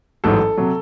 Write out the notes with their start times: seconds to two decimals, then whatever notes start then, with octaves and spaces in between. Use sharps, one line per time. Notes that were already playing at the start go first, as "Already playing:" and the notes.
0.24 A1 G#2 F#3 A4
0.58 C3 F#3